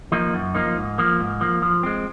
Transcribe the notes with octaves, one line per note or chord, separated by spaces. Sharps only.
F3 A#3 D#4
F#2
F3 A#3 D#4
G#2
F3 A#3
G#2
F3 A#3
F3
G#3 C4